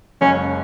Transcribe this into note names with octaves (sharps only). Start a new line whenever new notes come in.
F#1 F#2 C#3 G#3 C#4